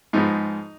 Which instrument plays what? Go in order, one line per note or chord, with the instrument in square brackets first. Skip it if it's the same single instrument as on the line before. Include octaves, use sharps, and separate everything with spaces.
[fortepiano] G#2 F3 G#3 B3 D#4